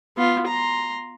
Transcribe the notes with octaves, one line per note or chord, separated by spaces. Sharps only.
B3 F4
A#5 C6